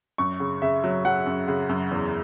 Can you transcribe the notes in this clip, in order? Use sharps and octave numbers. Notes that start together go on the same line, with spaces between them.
F#2 C#6
C#3
C#3 E5
F#3
F#3 F#5
F#2
C#3
F#2
E2